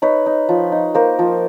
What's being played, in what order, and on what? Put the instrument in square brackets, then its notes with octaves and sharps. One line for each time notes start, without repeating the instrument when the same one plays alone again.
[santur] D#4 B4 C#5
D#4
F3
D#4
A#3 A#4 C5
F3